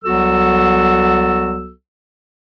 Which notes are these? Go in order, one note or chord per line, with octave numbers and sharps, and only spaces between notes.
C2 F#3 B3 F#4 A4 E6